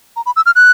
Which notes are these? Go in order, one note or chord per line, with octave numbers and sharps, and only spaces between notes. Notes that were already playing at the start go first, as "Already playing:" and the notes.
A#5
B5
E6
F6
F#6